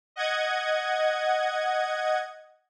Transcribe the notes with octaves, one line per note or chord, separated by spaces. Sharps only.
D#5 F#5 G#6